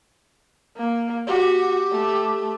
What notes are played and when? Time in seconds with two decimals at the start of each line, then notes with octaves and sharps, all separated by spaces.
0.77 A#3
1.27 F#4 G4
1.92 A3